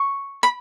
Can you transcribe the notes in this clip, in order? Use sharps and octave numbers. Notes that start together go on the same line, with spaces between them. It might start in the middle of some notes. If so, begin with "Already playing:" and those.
Already playing: C#6
B5